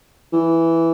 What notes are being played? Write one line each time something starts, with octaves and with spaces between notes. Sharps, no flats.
E3